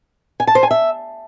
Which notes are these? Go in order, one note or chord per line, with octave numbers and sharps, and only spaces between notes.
G#5
A5
C5
G#5
E5